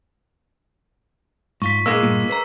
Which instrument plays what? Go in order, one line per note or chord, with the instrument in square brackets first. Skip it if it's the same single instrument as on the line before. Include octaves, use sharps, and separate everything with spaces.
[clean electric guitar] G#2 F4 [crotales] C#6 B6
[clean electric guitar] A#2 [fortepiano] G#3 A#3 [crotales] E6
[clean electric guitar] G2 A#2
B4 C5 A#5